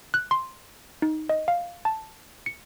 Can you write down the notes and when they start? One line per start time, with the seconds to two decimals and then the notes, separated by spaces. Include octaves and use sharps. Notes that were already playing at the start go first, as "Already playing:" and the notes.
0.14 F#6
0.31 C6
1.02 D#4
1.29 D#5
1.48 F5
1.85 A5
2.46 C#7